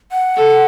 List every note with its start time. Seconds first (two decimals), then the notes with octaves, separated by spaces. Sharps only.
0.12 F#5
0.36 A4